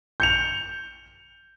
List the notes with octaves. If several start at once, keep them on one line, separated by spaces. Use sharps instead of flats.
G6 C#7 F7